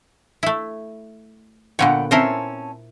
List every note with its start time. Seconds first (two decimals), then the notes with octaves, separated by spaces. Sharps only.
0.43 A3 E4
1.79 A#2 D3 B3 C#5 F#5 G5
2.11 C4 C#4 E4 A#4 C5 A5